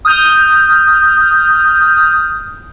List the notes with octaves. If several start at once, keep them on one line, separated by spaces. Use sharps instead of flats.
D#6 F6 G6